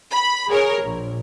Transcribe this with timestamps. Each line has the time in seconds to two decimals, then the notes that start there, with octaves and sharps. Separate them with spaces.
0.12 B5
0.49 G#4 A#4 C#5
0.84 A#1